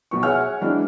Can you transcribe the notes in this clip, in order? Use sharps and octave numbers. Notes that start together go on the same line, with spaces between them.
B1 B3 C#6
G#4 C#5 E5 F#5 G#5 F6
E3 F#3 G#3 C4 D4 E4